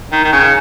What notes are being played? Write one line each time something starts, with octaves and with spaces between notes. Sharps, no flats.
D#3
D#3
C#3